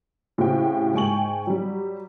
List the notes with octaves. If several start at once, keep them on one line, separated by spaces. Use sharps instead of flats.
A2 C#3 C4 F#4 G4 G5
G#2 G5 G#5 C#6 F#7
F#3 G3